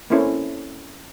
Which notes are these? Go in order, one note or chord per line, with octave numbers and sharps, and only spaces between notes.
A#3 C4 C#4 E4 A4 C5